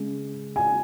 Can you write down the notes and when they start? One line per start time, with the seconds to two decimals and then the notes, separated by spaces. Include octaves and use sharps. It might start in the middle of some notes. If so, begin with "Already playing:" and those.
Already playing: C#3 G#3
0.56 G#5